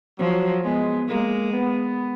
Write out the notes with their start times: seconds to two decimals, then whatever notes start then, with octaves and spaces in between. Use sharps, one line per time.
0.19 F3 F#3
0.64 G#3 B3
1.08 G#3 A#3
1.53 B3